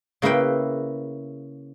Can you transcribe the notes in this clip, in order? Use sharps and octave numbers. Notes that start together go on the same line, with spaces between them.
C#3 A#3 E4 B4 G5